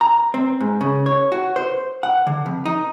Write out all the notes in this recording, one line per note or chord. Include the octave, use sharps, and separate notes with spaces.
A#5
C4
G#2
C#3
C#5
F#4
C5
F#5
D3
F2
D#4